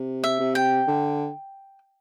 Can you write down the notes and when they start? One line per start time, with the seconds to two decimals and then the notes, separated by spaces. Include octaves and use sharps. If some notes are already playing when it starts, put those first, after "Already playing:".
Already playing: C3
0.24 E5
0.40 C3
0.55 G5
0.87 D3